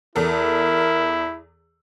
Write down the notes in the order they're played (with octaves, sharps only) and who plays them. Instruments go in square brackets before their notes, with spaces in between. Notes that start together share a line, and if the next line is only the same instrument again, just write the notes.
[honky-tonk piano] E2 A4 [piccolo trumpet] E4 [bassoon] A#4